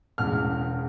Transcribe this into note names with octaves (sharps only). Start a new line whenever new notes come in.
E1 E2 C#3 E3 F6